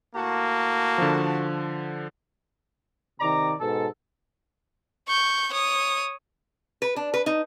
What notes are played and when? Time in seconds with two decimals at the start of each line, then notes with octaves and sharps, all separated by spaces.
0.15 A2 A#3 F#4 A5
0.98 D3 F3
3.21 C3 D#3 D5 A#5
3.60 G#2 B2 A4
5.08 C#6 G6
5.52 C#5 D#6
6.82 B4
6.96 D4
7.14 B4
7.26 D#4